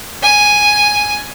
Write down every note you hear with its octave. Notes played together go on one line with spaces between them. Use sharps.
G#5